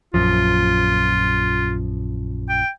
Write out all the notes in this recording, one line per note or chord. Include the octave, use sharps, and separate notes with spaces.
A#1 F#2 F3 F4
G5